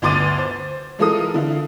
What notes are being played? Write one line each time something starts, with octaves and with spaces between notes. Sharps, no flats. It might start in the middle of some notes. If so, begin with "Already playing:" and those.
G1 D2 C6 D6 A6 D#7
C5
E3 G#3 F4 A4 A#4 D#6
D3 E4 F4